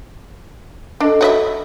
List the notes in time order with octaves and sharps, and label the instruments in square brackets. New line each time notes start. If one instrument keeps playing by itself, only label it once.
[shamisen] D4 [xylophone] A4 D#5 D7
[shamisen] F#4 D5 E5 [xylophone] C#5 B5